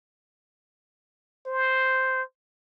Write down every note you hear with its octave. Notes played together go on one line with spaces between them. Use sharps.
C5